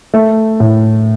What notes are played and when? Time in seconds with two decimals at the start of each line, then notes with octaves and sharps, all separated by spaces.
0.14 A3
0.60 A2